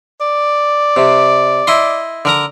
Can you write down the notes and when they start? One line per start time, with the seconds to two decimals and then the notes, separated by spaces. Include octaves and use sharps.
0.21 D5
0.97 C3
1.67 E4 D#5 C6
2.25 D3 A#4 A#5